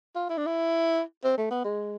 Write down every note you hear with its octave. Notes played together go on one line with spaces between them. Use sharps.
F4
E4
D4
E4
C4
A3
B3
G#3